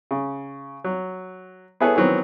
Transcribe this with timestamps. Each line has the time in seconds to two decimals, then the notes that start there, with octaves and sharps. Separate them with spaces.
0.11 C#3
0.84 F#3
1.81 B3 E4 G#4 A4 B4 C#5
1.96 D#3 E3 F#3 B3 C4